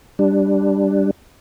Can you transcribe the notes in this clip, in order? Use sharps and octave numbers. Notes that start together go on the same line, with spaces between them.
G3 D4